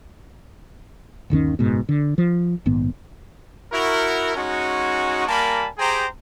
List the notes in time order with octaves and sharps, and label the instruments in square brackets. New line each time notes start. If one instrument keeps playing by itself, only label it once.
[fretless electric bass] G1 D#2 D#3 C#4
F#1 G#2 B2
D3
F3
A#1 G#2 D#3 B3
[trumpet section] E4 F#4 A#4
G#3 C#4 D#4 F#4
G3 A#3 A#4 G#5 A5 B5
G4 G#4 C5 G5 A#5